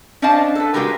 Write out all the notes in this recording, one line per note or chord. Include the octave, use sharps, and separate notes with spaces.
C#4 D4 C5 D#5 F5 A5
A4 B4
C#3 G#3 F#4 G4 A#4 B4